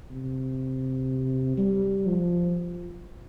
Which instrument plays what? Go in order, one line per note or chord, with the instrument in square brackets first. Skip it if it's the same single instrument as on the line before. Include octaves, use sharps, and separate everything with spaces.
[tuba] C3
G3
F3